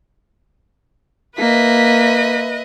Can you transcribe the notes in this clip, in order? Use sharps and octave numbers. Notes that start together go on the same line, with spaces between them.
A#3 B4 D#5 E5 B6